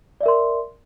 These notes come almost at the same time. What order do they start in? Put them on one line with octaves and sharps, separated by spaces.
D5 E5 A#4 C6